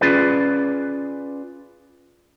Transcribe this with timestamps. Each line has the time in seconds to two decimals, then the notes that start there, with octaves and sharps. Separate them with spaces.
0.01 C#4 F4 G#4 B4 D5